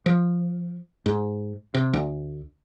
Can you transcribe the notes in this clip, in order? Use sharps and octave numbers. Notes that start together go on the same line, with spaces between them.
F3
G#2
C3
D2